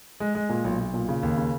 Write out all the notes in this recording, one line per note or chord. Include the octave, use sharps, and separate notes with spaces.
G#3
G#3
A#2
B1
B1
A#2
C#3
D#2
C#3